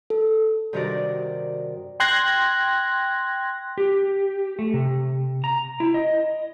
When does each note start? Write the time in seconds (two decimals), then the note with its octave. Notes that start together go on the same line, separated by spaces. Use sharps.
0.10 A4
0.73 G2 C3 D#3 F#4 A#4 D5
2.00 G5 C6 F#6 G#6 A#6
3.78 G4
4.59 A3
4.74 C3
5.44 A#5
5.80 E4
5.94 D#5